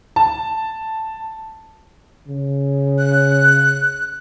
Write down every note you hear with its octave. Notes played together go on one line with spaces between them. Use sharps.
A5
C#3
F#6